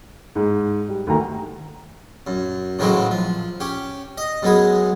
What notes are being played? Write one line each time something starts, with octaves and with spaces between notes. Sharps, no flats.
G#2
G3
D2 D#3 A#5
F#2
A2 C#3 E3 F#3 G#3 C4
F3
C#4 G4
D#5
F#2 G#3 B3 G#4